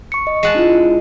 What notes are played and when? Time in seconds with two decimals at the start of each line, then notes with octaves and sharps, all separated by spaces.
0.12 C#6 C#7
0.27 D#5
0.43 G#3 F#5 A5
0.55 D4 E4 F4